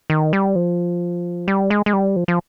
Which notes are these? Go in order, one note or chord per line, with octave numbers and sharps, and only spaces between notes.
D#3
G3
F3
G3
G#3
G#3
G3
F3
F3